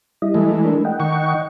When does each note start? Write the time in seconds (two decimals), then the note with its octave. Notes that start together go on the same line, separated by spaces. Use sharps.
0.22 G3 E4 D#5
0.34 E3 G#3 A3
0.65 D4 A#4
0.85 D#5 F#5 G5
1.00 D#3 C#6